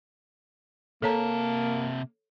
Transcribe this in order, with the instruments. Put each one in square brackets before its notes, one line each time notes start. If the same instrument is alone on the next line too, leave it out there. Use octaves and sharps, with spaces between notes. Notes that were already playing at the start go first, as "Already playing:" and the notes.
[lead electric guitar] C3 A5 [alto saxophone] A#3 [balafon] A4 C#5 A#5